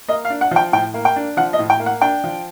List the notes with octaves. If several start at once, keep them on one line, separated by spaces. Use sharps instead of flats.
A#3 D#5
F5
D4
F#5
F3 G5
A2 G5
A#3
G5
D4
F3 F#5
D#5
A2
G5
A#3
F#5
D4 G5
F3